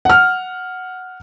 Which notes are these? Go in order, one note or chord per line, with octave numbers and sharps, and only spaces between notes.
F#5 F6